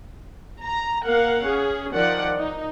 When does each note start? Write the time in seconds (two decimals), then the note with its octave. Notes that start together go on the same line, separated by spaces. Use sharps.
0.62 A#5
1.05 A#3 A#4 F5 F#5
1.46 C#4 G#4
1.94 D#3 F3 D5 F#5
2.37 D#4